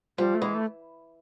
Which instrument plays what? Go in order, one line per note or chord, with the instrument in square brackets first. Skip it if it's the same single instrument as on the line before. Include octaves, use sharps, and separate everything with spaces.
[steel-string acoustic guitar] F3 [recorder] G3
[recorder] A3
[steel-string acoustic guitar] E3 [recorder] G#3
[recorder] A3